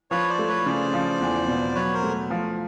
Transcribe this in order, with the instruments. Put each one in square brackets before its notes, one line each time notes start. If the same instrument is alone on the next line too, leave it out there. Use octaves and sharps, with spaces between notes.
[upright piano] F3 [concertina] B4 C#5
[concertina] C5 D5
[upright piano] A3
[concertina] B4 C#5
[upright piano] C#3 [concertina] C5 D5
[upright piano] F3
E2
B2
[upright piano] F#3 [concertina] B4 C#5
[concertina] A#4 C5
[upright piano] A3
F3